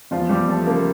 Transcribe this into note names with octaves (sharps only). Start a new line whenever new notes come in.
E2 F3 F4
E2 G3 G4
F3 A3 A4
C#3 A#3 A#4